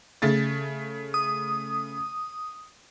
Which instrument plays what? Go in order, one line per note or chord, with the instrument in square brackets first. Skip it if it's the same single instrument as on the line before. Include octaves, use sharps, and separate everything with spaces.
[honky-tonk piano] C#3 A3 A6
[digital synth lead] D#6